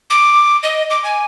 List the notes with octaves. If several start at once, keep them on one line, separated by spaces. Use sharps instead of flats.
D6
D#5
D6
G#5